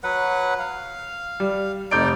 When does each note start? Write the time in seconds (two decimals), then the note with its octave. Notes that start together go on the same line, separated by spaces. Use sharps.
0.03 F#3 B4 F#5
0.59 F5
1.40 G3
1.91 F1 D#4 D5 G6 D7